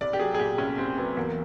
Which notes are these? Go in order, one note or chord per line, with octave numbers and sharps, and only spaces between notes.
C2 D5
G4
F#3 G#4
G#4
A#2 G4
C2 C#4
C2 C4
F#3 B3
E2 A#3